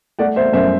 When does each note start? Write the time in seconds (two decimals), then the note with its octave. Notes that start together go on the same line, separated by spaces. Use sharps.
0.19 A3 D5 F#5
0.36 C5 E5
0.53 F#2 C5 E5